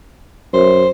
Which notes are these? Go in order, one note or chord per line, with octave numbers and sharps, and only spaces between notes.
F#2 C5